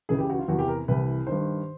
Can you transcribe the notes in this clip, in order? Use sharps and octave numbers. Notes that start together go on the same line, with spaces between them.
C#2 C#3 E3 G#4
G4
F#4
F4
E2 C3 E3 F#4
G4
A#4
C2 C3 E3 B4
G2 D#3 C5